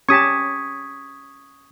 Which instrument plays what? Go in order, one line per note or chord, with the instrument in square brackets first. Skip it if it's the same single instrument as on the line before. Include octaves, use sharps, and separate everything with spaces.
[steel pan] C#4 G4 A5 [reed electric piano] C#6 D#6 [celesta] G#6 B6